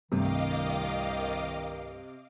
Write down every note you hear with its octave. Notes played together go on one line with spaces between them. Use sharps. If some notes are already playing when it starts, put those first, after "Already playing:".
C2 G2 C3 D#3 A3 D#5 F5 D6